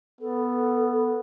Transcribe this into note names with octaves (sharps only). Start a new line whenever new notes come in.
B3 A4